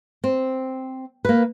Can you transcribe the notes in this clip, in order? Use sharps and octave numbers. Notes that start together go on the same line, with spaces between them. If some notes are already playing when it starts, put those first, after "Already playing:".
C4
A#3 B4